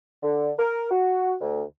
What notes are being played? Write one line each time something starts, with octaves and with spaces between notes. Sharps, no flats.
D3
A#4
F#4
D2